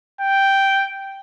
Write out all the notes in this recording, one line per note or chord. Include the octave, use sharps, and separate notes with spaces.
G5